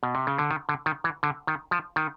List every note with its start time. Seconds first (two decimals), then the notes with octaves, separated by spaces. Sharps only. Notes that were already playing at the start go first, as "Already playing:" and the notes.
0.03 B2
0.15 C3
0.27 C#3
0.38 D3
0.51 D#3
0.69 D3
0.86 D#3
1.04 E3
1.23 D3
1.47 D#3
1.71 F3
1.96 D#3